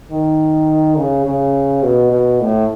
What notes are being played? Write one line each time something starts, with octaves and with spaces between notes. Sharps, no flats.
D#3
C#3
C#3
B2
B2
A2